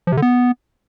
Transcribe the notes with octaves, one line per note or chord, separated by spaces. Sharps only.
F3
C3
D3
B3